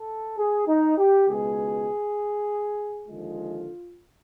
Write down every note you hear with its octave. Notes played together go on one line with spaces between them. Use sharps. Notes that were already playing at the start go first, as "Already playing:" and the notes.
Already playing: A4
G#4
D#4
G4
C#2 B2 G#3 G#4
D#2 D3 F3 G#3 F4